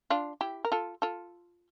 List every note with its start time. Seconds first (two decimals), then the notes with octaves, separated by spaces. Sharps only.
0.10 D4 F4
0.41 E4 G4
0.65 A#4
0.72 F4 A4
1.02 F4 A4